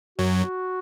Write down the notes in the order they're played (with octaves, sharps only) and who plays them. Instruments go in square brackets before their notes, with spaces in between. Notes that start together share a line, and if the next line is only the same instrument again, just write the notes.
[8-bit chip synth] F#2 F#3 [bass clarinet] F#4